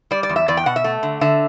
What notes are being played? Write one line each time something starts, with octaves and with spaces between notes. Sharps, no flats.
G3 D5
D5
E2
E5
E2 D5
G5
B2 F#5
E5
A3
D3
D3 E5